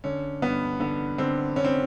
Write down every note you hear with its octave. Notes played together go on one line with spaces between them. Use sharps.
D3 C#4
G2 B3
D3 B3
D3 C4
D3 C#4
C4